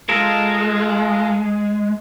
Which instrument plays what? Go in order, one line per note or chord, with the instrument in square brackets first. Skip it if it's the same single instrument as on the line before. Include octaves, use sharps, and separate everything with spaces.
[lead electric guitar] G#3 [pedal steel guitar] F4 A4 A#4